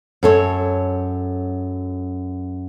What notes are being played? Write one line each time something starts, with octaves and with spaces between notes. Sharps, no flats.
F#2 A4 C#5